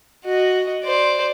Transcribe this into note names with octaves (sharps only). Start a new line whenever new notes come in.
F#4 D#5
C5 D5